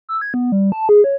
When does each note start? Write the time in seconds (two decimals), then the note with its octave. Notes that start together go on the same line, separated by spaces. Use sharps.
0.09 E6
0.21 G#6
0.34 B3
0.52 G3
0.72 A5
0.89 G#4
1.04 C#5